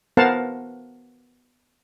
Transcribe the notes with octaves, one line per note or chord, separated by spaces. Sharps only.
B3 A#4 C5 F5 F#5 A5